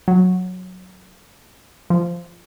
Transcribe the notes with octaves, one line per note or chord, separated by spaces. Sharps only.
F#3
F3